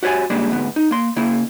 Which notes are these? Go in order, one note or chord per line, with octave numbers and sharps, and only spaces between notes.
F#4 G4 C#5 F5 G#5
C#3 G3 G#3 A#3 D4
D2 G#2 B3
D#4
A#3 C6
C#3 A#3 E4